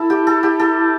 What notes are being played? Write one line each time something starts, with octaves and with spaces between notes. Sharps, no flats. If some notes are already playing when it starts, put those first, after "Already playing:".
Already playing: E4 A4
G4
A4
G4
A4